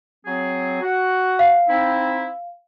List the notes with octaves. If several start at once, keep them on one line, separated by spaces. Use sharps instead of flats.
F#3 C4 G#4
F#4 F#5
F5
C4 D#4 E4